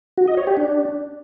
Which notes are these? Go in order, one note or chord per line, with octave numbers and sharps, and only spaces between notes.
F#4
D#5
C#5
G4
D4